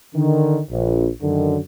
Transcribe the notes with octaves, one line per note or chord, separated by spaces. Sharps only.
D3 D#3
A#1
F#2 D3 D#3